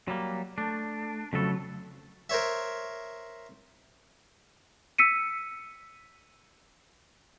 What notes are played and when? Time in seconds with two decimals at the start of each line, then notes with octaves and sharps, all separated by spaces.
0.08 F#3 G3 A#3
0.58 A3 D4
1.33 F2 C#3 F#3 A3 A4
2.30 A#4 C5 C#5 E5
4.98 E6 B6 C#7 D#7